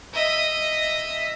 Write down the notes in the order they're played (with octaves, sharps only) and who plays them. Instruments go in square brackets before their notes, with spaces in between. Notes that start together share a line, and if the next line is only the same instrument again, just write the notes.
[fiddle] D#5 E5